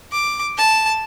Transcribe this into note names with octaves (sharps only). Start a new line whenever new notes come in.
D6
A5